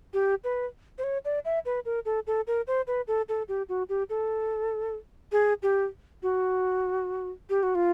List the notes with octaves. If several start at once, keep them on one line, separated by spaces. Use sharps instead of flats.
G4
B4
C5
C#5
D5
E5
B4
A#4
A4
A4
A#4
C5
B4
A4
A4
G4
F#4
G4
A4
G#4
G4
F#4
G4
F#4
F4